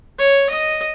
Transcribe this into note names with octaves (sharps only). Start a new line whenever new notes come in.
C#5
D#5